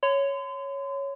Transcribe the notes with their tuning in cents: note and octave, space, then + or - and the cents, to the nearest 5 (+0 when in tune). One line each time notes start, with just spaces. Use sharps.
C#5 +0 C6 -40